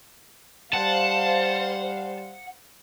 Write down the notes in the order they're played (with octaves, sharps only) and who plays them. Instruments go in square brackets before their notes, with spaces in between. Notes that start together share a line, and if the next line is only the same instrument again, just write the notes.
[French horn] G3 [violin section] C5 F5 [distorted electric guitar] F#5 [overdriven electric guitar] A5